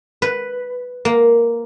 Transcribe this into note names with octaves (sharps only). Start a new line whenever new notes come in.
B4
A#3